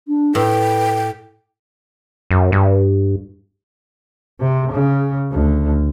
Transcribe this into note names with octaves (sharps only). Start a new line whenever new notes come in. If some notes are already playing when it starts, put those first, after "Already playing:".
D4
A2 B4 G5
F#2
G2
C3
C#3
D2